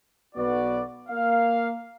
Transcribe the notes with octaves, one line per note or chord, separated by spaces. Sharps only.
B1 B3 F#4 D5
A#3 F5